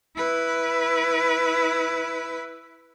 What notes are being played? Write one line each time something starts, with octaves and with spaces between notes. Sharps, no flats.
E4 B4